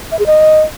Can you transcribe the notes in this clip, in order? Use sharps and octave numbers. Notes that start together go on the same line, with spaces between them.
E5
G#4
D#5